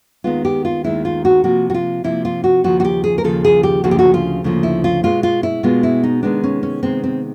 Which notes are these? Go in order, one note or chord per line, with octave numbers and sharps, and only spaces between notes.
D#2 D#3 G#3 B3 F4
G4
F4
D#2 D#3 G#3 B3 E4
F4
F#4
C3 F3 A#3 F#4
F#4
F4
C3 F3 A#3 E4
F4
F#4
D#2 C#3 F3 F#4
F#4
G4
G#4
A#4
D#2 C#3 F3 A4
G#4
G4
D2 C#3 F3 A#3 F#4
G4
F#4
F4
D2 C#3 F3 A#3
E4
F4
B2 G#3 B3 F4
F4
E4
B2 G#3 B3 F4
E4
D#4
C3 D#3 G#3 B3 D4
C#4
C#4
C3 D#3 G#3 B3 C4
C4